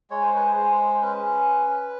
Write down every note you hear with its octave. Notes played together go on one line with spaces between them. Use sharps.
G#3 C#5
C5
B4
C5
G#3
C#4 B4